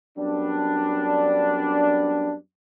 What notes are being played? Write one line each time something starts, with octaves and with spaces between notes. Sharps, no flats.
F#2 G3 B3 D4